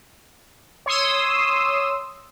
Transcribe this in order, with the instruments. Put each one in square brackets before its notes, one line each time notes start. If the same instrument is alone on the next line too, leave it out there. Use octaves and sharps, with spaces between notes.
[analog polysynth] C#5 C6 D#6 E6